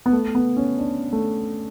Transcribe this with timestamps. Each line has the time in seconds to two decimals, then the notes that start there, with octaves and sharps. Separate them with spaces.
0.06 B3
0.13 A3
0.35 B3
0.57 C#4
0.78 D4
1.13 A3